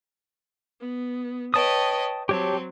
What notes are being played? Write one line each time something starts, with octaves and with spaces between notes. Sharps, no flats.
B3
B4 C#5 D#5 G5 A5 D#6
F#3 C4 G4 C#5 A5